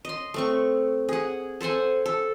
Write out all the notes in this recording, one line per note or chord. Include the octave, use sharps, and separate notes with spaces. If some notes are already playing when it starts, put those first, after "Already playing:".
D#5 C6
A3 C4 C#6
G#4 F#5
A4 C5 F#5 G#5
A4